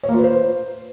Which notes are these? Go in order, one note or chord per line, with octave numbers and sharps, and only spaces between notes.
C#5
A#3
F4
B4
C5